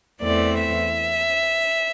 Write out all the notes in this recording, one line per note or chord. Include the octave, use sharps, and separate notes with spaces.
E2 E3 A3 C4 D5
E5